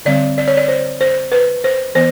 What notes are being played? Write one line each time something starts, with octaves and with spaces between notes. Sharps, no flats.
D3 G3 C4 D5
D5
C#5
D5
C5
C5
B4
C5
E3 B3 C5